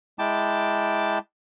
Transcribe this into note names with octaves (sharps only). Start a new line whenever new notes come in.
G#3 E4 G5 A5 D6